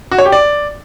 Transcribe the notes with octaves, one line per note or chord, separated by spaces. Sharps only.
F#4
C#5
G4
D5